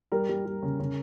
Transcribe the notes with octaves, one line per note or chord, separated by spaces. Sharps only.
G3 A#4
G3
G3
C#3
C#3